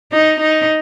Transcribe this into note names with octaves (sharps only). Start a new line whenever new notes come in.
D#4
D#4